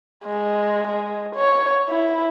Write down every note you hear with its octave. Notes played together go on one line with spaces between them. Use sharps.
G#3
G#3
C#5
E4